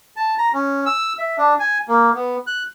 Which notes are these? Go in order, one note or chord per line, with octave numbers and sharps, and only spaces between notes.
A5
A#5
C#4
E6
E5
D4
G#5
A#3
B3
F#6